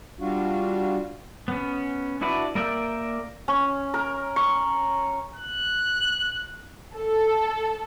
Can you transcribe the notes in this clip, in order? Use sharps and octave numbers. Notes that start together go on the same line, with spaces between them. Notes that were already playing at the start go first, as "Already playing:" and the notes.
G3 D4 F4 F#4
B3 C#4
D4 E4 F#4 B4 D5
A#3 A#4 D5 E5 G5
C#4
A#4
C#6
F#6
A4